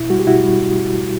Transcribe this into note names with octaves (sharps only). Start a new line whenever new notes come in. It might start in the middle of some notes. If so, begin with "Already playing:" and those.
Already playing: B2 E4
G3 F#4
G4
B2 E4 F#4
G3